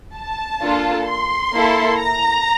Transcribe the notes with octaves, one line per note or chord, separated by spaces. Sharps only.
A5
A#3 D4 F4 A4
C6
A#3 E4 A4
A#5